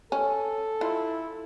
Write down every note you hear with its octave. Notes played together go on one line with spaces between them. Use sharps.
C#4 A4
E4 F4